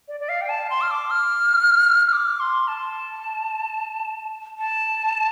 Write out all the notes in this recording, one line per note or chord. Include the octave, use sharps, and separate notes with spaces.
D5
D5
F5
G5
A5
C6
F6
D6
F6
F6
D6
C6
A5
A5